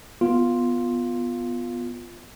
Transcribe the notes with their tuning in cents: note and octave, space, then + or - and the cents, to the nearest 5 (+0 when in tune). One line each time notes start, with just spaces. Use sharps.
B3 +0 F4 +0